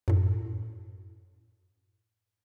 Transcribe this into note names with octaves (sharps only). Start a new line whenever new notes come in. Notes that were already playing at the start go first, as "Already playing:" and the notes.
F#2 A2